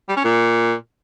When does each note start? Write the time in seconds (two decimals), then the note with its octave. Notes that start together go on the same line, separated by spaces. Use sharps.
0.09 G3
0.16 C#4
0.24 A#2